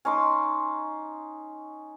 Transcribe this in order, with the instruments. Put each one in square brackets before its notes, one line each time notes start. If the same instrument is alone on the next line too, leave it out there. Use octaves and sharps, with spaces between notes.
[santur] C#4 D#4 C6 D6